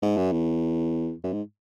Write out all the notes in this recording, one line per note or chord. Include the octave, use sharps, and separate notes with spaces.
G#2
F#2
E2
F#2
G#2